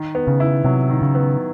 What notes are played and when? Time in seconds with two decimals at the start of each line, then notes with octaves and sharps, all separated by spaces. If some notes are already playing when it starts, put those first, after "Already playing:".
Already playing: D#3
0.15 B3
0.27 C#3
0.40 E4
0.64 C3 F#3
0.89 D#3
1.02 C#3
1.15 B3